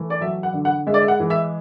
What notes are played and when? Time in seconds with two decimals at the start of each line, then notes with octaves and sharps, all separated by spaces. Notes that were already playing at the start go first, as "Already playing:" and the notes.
Already playing: E3 A3
0.10 D5
0.21 F#3 E5
0.43 F#5
0.53 D3
0.65 F#5
0.87 G#3 E5
0.94 D5
1.01 E5
1.08 F#5
1.20 E3
1.30 E5